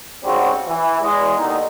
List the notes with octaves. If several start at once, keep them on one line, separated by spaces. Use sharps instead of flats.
G#2 C#3 G3 C4 C#4 F#4
E3
E2 G#3
D#2 D3 D#3 D#4